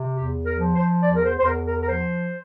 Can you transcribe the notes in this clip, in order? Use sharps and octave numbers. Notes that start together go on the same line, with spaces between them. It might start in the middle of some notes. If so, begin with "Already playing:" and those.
Already playing: C3
E2 G4
A#4
F3
C5
E2 D5
A#4
C5
C5
E2 A#4
A#4
A#4
F3 C5